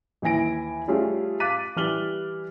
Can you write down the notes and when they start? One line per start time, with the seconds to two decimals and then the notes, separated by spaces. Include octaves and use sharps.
0.22 D#2 E3 E4 G#5 A#6 D7
0.88 G3 A3 C#4 F4 G#4
1.40 F5 D6 F#6 A6 B6 D#7
1.76 E3 G3 F6 F#7 G7